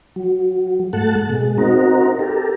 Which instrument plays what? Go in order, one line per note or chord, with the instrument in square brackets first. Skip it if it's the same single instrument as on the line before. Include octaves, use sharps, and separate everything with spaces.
[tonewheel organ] F#3
G#2 A3 F#5 A5
B2 G#3
C4 D#4 F#4 A#4
G4 A4 A#4